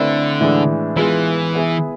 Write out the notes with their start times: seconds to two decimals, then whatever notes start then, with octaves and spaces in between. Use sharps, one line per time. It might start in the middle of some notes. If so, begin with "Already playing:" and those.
Already playing: D3 A3 C4 E4 B4 D5
0.40 A2 E3 G#3 D4
0.97 E3 G#3 B3 F4 G#4 B4
1.54 B3 E4 G#4 B4